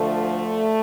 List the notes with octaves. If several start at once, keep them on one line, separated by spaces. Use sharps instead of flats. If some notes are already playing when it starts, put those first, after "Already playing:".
Already playing: D2 D3 F3 A3